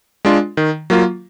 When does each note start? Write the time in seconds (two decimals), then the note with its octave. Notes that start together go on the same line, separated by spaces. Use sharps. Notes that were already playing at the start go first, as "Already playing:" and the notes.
0.25 G#3 D4 F4
0.57 D#3
0.90 F#3 A#3 F4